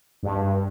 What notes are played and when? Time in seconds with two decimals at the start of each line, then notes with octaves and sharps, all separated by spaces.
0.23 G2